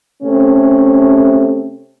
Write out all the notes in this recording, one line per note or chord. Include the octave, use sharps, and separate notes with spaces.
C3 A3 C#4